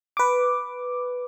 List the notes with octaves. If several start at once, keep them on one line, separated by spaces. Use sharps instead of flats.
B4 D6